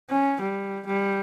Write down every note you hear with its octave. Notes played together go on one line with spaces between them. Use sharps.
C#4
G3
G3